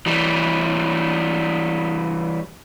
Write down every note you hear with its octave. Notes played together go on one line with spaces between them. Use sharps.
E3 G3